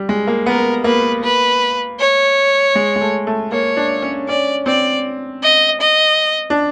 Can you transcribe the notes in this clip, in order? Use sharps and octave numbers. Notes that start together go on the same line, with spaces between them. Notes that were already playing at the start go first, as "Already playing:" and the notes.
Already playing: G3
G#3
A#3
B3 A#4
A#3 B4
B4
C#5
G#3
G#3
A3
A3
A#3 C#5
D4
C#4
C#4 D5
C4 D5
D#5
D#5
D4